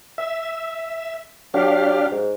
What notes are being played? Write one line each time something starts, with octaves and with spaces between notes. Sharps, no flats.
E5
F#3 D4 G4 F5
G#2